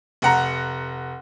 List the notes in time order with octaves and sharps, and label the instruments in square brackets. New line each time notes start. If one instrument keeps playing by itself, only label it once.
[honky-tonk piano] F1 F#5 A#5